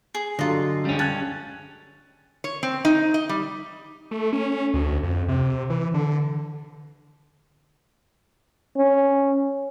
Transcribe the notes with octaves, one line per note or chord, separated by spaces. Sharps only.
G#4
G2 D3 F#3 F4 A4 D#5
C#2 C#3 G3 C#4
A5 F#6 G#6
C#5
C4
D#4
D#5
G3
A3
C#4
D2
F2
C3
E3
D3
C#4